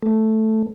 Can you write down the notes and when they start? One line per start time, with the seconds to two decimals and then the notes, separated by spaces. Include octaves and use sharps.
0.03 A3